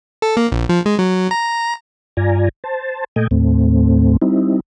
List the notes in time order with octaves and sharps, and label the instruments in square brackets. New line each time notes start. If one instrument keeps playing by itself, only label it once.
[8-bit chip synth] A4
A#3
A#1
F3
G#3
F#3
A#5
[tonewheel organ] G2 F4 D5 G#5 A#5
C5 A5
A#2 A3 A4 D#5 G5 G#5
D#2 A2 A3 C4
G3 C4 D#4 E4